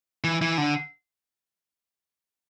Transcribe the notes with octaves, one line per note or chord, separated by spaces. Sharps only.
E3
E3
D3